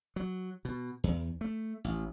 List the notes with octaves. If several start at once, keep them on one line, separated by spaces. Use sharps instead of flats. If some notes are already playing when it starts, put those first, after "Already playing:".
F#3
B2
E2
A3
A1